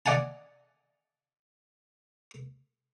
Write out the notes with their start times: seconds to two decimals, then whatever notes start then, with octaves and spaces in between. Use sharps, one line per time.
0.06 D5 D#5 F#5 G#5 A5